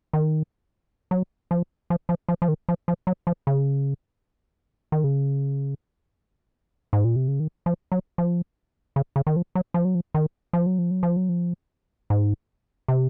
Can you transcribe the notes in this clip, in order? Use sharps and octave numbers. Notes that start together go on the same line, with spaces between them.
D#3
F#3
F3
F3
F3
F3
F3
D#3
F3
F3
F#3
F3
C#3
D#3
C#3
G#2
A#2
C3
C#3
D#3
F3
F#3
F3
C#3
C#3
D#3
F3
F#3
F3
F#3
F3
D#3
F3
F#3
F3
F#3
F3
F#3
F3
G#2
C3